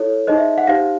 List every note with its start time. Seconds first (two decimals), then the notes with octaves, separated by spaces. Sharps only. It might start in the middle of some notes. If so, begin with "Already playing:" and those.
Already playing: E4 A4 C#5
0.27 D#4 G#4 C5 D#5
0.38 E5
0.58 F#5
0.67 D#4 G4 C5 F5